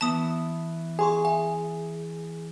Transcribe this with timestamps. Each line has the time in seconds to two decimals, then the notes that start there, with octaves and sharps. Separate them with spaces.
0.01 E3 B3 A5 D#6
0.99 G#4 G#5 C6 C#6
1.25 E5 G#5